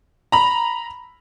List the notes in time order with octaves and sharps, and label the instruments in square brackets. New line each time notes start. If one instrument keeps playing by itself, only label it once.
[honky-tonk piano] A#5 B5